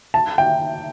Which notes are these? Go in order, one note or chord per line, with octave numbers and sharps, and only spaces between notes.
A5
G5